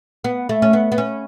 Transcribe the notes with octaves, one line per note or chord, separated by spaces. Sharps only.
B3
A3
C#4
B3
B3
C#4